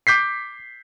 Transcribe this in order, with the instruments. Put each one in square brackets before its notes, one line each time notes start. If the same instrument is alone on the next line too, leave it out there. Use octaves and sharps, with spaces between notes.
[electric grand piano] D6 G6 B6 C7